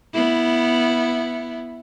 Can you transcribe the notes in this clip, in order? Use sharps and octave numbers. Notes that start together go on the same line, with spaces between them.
B3 E4